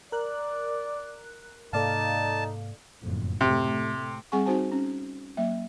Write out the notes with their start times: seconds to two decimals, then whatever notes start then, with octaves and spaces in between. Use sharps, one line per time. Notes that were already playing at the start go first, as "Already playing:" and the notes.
0.12 A#4 D5 F#6
1.73 G#2 C3 A#3 D#4 A4 D5 F5 A5
3.01 F#1 F2 A2
3.41 A2 C3 A3
4.32 G3 C4 G#4 F#5 G#5 C#6
4.46 C4 D#4 F#4 C5 G#5 A5
4.72 C#4
5.37 F#3 A#3 E5